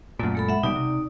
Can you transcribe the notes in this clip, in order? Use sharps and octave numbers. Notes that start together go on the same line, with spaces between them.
F#2 A#2 A3
G#3 A4 B5
E5 F#5
B2 G3 D#4 D5
C3